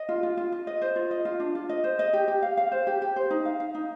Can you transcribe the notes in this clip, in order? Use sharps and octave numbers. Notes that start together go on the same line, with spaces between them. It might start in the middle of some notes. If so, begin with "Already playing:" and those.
Already playing: D#5
F4
F4
F4
F4
D#5
C5
F4
D#5
F4
D4
F4
D#5
C5
D#5
G4
G4
F5
F5
C5
G4
G4
C5
D#4
F5
F5
D#4